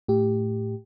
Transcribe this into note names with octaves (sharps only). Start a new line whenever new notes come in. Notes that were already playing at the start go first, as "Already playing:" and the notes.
A2 G4